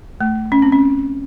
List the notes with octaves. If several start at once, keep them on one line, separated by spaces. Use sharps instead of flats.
A3
C#4
C4
C#4